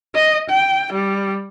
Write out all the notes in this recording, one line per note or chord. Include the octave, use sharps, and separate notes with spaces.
D#5
G5
G3